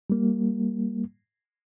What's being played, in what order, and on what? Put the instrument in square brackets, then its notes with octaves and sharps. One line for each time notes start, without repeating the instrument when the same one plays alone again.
[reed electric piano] G3 A#3